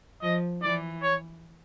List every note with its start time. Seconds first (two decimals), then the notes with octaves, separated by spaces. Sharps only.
0.22 F3 D#5
0.62 E3 D5
1.02 C#5